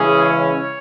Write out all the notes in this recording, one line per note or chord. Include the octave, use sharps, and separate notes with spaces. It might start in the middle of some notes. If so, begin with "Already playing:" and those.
Already playing: C#3 E3 G#3 C#4 E4 G#4
C#5